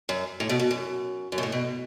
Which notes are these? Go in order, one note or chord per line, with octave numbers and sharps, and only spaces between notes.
F#2
A2
B2
B2
F#2
F#2
B2
A2
B2